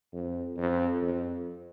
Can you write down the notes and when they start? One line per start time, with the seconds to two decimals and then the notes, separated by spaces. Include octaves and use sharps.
0.13 F2
0.57 F2
1.02 F2